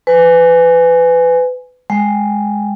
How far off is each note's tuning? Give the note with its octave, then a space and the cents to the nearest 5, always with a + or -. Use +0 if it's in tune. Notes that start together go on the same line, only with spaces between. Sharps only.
B4 +25 G#5 +0
G#3 +0 G5 +0